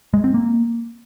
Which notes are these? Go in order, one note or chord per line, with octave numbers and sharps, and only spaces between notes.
G#3
C4
A#3